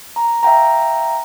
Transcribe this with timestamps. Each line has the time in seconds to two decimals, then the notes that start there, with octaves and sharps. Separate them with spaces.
0.16 A#5
0.43 E5 F5 G5 A#5